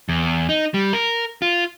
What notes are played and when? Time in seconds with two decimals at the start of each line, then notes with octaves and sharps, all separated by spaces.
0.09 E2
0.49 D#4
0.74 G3
0.93 A#4
1.42 F4